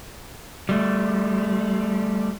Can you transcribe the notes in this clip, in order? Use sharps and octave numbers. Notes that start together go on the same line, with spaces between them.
G3 A3